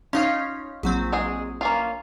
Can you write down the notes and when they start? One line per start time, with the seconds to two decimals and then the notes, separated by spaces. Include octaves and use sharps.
0.13 C#4 D#4 F4 C#5 F5
0.83 A#1 F#3 C4
1.12 G#3 G#4
1.61 A#3 C#4 F4